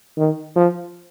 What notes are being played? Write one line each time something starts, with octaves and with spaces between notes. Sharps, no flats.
D#3
F3